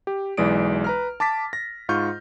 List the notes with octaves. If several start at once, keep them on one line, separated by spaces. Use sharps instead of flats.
G4
B1 E3 G#3 D5 D#6 D7
B4 A#5 F6
A5 D6 A6 B6
A#6
G#2 F4 C#6 F6 G6